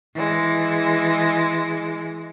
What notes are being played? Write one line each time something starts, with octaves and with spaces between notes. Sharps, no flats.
E3 G#3